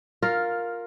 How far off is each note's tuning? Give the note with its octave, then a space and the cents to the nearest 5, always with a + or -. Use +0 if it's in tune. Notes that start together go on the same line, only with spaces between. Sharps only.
F4 +10 A#4 +0